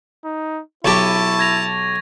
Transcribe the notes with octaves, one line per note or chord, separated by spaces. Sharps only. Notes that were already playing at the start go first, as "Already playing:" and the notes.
D#4
B1 E4 G4 A5 C#6
G#6 A#6 F7